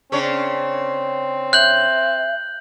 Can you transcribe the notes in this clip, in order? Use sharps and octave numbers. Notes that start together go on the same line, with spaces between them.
C#3 C4 D4 C#5
E5 F#6 G6 F#7